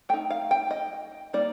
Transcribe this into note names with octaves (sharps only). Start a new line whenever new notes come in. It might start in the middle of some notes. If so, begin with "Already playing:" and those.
A3 D#4 G5
F5
G5
D#5
G3 A#3 D#4 D5